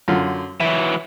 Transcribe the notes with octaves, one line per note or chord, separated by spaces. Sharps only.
F#2 D3 F4
E3 F#3 E5